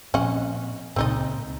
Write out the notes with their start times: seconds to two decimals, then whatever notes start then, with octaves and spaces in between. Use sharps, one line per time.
0.14 A#2 F3 C4 C#4 D#5 F#5
0.96 C#2 A#2 C4 D#4 D#5